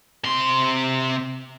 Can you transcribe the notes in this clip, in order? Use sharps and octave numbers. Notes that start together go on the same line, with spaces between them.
C3 C6